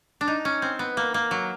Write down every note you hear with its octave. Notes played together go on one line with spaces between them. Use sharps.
D4
D#4
C#4
C4
B3
A#3
A#3
F#3